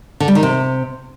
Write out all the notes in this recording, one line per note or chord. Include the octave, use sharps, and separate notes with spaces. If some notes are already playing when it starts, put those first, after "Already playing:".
D3
G3
D#3
C3